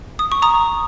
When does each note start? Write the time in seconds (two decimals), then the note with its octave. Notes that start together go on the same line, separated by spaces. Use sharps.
0.19 D#6
0.32 C#6
0.42 A#5 D#6